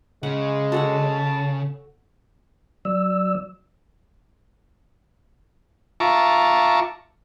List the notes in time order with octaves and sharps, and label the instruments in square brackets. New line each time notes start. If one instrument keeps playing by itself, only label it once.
[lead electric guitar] C#3 [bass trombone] G#3 [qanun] F#5
[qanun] F#4 A4 F#5 [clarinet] A5
[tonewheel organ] F#3 D5 E6
[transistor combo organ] F4 E5 A5 A#5 C#6 D6